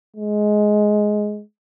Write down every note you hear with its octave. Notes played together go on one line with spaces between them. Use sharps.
G#3